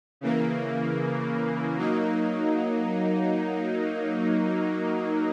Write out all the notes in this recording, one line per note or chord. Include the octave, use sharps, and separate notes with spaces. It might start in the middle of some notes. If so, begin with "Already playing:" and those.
C#3 E3 A#3
F#3 A#3 D#4